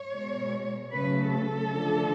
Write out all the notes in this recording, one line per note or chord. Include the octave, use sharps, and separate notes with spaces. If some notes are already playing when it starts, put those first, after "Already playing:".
Already playing: C#5
B2 G#3
C#3 F#3 A3 B4
A4
D3 F3 A3